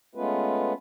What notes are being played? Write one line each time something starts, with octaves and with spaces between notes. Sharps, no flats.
G#3 A3 B3 C#4 F4 B4